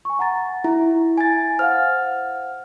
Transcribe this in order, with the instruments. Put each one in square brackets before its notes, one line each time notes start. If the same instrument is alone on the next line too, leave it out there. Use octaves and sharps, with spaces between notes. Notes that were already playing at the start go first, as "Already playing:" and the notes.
[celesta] G#5 C#6
F#5 A#5 A6
[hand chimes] E4 [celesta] A#5
[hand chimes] G#5 A6
[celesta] C5 F5 F#5 [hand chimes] F6